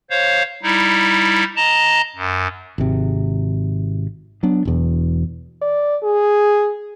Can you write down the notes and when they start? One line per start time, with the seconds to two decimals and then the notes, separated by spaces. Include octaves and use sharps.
0.10 C5 C#5 F5
0.63 G3 D#4 E4
1.56 D#5 A5 A#5
2.16 F#2
2.78 G#1 C3
4.43 F#3 B3 D4
4.65 E1 E2
5.62 D5
6.03 G#4